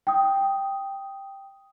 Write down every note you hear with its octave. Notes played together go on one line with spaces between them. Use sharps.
G5 D#6